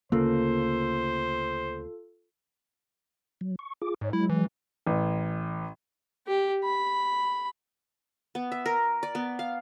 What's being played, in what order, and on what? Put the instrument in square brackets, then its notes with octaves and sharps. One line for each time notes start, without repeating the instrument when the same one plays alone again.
[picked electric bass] D2 C#3 [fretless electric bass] A#3 [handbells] F4 A4 [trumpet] C5
[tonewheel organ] F#3
C#6
F4 G#4 D6
[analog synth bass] G#2 [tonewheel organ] C#5
[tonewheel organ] F#3 G#3 [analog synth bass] E4
[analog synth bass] E3
[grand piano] A1
[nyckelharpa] G4
B5
[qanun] B3
E5
A#4
D5
B3
F5